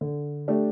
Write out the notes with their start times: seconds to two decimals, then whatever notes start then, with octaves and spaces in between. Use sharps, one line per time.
0.01 D3
0.48 A3 D4 G4